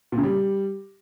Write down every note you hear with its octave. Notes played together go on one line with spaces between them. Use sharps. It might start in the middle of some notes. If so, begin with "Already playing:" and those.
A#2
C#3
G3